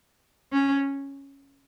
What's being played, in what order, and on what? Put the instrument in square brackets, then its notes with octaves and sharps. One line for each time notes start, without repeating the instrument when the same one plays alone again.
[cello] C#4